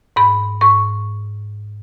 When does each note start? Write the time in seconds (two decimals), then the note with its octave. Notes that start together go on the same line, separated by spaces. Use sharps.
0.16 G#2 B5
0.61 G#2 C#6